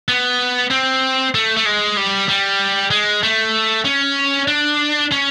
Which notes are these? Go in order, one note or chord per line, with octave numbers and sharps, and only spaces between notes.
B3
C4
A3
A3
G#3
G3
G3
G#3
A3
C#4
D4
C#4